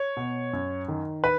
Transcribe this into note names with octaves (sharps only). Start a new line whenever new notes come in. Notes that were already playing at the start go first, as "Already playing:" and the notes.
Already playing: C#5
B2
F#2
D#3
B4